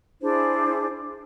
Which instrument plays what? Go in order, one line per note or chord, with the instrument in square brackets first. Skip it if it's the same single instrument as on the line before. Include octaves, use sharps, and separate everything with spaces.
[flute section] D4 E4 G#4 C5